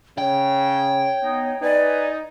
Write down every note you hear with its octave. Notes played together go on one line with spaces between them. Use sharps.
C#3 C#5 G5
B3 D#4
D#4 B4 D5 G#5